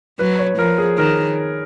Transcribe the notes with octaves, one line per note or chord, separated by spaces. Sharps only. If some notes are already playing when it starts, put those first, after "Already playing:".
F#3 B4
C#5
F3 A#4
G#4
D#3 A#4